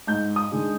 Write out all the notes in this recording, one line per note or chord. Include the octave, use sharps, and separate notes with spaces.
G#2 G6
D#6
D#3 G#3 D4